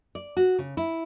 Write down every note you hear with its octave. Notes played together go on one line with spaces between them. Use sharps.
D5
F#4
C#3
E4